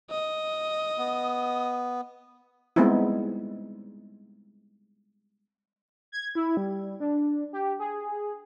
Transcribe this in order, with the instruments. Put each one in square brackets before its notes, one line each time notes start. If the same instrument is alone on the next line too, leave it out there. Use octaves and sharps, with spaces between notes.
[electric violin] D#5
[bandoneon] B3
[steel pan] G3 G#3 B3 C4 D#4 E4
[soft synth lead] G#6
E4
G3
D4
G4
G#4